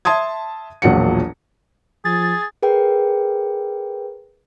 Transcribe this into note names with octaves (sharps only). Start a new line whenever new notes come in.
E5 A5 C6 D#6 G#6
E1 A#1 A#2 F#3 F#5 C#7
F3 G#4 A6
G#4 A#4 B4 G5